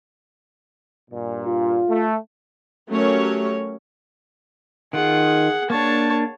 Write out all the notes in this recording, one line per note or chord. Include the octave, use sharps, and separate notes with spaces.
G2 A#2
F4
A3
F#3 A3 C#4 G4 A#4 C#5
D#3 F4 G#4 F#5
A#3 D4 C#5 A5